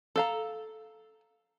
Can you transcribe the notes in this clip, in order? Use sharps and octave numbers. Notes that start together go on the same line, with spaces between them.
A4 F5 A#5